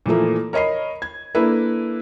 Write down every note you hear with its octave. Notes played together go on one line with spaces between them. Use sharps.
A#2 E3 F3 A3 A#3
A#4 C#5 D#5 B5 C7
G#6
A#3 D4 E4 A4 B4